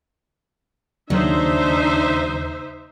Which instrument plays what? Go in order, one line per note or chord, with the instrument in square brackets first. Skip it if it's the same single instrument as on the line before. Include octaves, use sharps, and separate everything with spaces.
[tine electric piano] D#2 C#3 [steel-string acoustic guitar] F#3 [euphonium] D4 [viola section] D#4 C5 E5